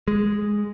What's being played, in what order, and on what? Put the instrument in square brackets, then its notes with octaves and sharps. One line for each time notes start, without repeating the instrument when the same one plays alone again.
[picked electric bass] G#3